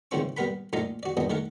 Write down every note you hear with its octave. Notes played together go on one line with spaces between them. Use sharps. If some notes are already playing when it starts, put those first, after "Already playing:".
E2 G#2 C#3 F3 C4 C#6
G3 B3 A#4 F#5 B5
A#1 A#2 A3 D#4 F5 A#5
F#4 D5
A#1 G3 B3 D4 D#5
D#3 A3 A#4 F#5